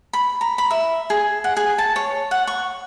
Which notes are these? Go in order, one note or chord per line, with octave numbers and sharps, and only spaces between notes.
B5
A#5
B5
E5
G#4
F#5
G#4
A5
C#5
F#5
C#6